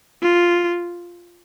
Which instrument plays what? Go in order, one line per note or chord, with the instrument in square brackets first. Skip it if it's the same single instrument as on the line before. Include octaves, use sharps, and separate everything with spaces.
[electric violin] F4